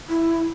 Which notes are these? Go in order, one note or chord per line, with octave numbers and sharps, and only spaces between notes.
E4